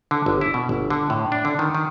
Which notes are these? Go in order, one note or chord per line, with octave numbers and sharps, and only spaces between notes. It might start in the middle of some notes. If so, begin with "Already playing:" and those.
D3
G1
E4
B2
G1
D3
A2
D4
D3
D#3
D#3